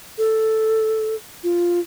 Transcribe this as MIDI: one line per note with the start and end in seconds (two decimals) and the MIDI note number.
0.18 1.15 69
1.44 1.80 65